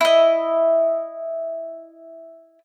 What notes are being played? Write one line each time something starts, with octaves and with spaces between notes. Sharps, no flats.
E4 D#5